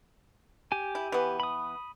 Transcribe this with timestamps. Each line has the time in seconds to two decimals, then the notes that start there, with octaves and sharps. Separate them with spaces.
0.72 G4 G#5
0.95 E4
1.12 E3 B3
1.40 B5 D#6